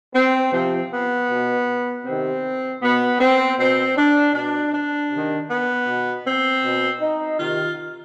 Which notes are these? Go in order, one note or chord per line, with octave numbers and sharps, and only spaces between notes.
C4
C3 F3 C4
B3
B2
C3 D#3 C4
B2 B3
C4
B2 C4
D4
B2 D4
D4
C3 D#3
B3
B2
C4
B2
D#4
C3 D#3 F4